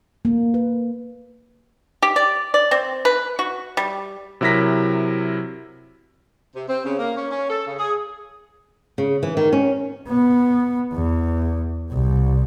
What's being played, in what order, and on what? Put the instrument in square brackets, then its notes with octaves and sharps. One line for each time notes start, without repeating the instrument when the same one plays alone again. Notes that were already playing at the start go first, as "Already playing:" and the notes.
[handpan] A#3
B4
[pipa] G4
D5
D5
C4
B4
F#4
G3
[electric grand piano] C3 F#3 E4 A#4 A#6 B6
[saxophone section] C3
C4
C#3
A#3
C#4
C#4
A4
C#3
G#4
[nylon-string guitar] C#3
E3
D#3
C#4
[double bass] B3
E2
C2